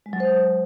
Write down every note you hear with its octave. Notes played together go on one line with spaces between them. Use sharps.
G#3
F#3
C5